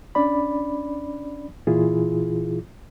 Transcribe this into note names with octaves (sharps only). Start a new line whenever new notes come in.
C#4 D4 D5 B5
A#2 E3 E4 F4 G#4